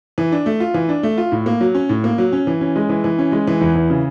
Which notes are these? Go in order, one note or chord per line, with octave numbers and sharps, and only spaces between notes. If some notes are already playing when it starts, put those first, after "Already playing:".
E3
D4
A3
F4
E3
D4
A3
F4
A2
A#3
F#3
C#4
A2
A#3
F#3
C#4
E3
C#4
G#3
E3
E3
C#4
G#3
E3
E2
E3
C#3